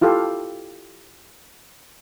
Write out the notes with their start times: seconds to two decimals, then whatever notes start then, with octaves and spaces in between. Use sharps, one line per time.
0.01 E4 F4 G4 A4 F5